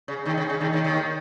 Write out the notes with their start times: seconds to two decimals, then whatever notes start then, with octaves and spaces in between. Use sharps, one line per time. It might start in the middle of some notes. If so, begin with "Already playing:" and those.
0.08 C#3
0.26 D#2 D#3
0.38 C#3
0.49 C#3
0.61 D#2 D#3
0.73 D#2 D#3
0.84 D#2 D#3